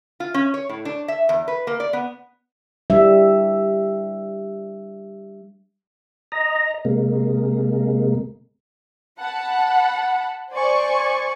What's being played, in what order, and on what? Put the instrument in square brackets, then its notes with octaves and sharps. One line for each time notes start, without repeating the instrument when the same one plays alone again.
[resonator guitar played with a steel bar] F4
C#4
C#5
A2
D4
E5
E2
B4
A#3
D5
B3
[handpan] G3 D4 E5
[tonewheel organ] D#5 A#5
C3 G#3 A#3
[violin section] F#5 A5 B5
C5 D5 G#5 C#6